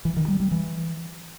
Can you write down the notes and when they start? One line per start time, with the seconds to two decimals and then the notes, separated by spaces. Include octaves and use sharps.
0.05 E3
0.17 D#3
0.28 G3
0.40 G3
0.51 E3